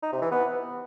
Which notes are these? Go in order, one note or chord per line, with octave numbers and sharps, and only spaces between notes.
D#4
C3
E3
B3